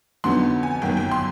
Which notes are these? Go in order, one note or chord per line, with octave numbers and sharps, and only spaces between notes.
F2 D3 F#3 B3 D#4 C6
G#5
G1 F#2 D#3 F#3 A#3 G5
G5
C6